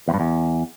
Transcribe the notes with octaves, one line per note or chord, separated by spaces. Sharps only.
E2
G2
E2